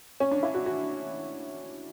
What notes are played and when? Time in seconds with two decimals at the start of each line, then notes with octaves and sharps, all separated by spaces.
0.20 C#4
0.31 D4
0.43 E4
0.54 F#4
0.66 F#4